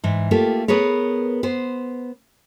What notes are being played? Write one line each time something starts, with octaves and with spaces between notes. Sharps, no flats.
G#2 E3
A3 A#3 F4 G4
B3 G#4 A#4 B4 C#5
B3 C5